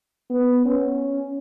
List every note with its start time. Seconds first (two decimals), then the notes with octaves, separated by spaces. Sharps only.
0.30 B3
0.65 C#4